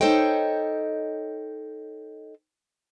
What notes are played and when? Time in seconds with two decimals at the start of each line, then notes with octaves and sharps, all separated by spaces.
0.01 D#4 A4 C5 C#5 D#5 G5